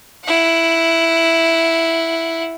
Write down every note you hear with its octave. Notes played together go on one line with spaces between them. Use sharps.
E4 F#5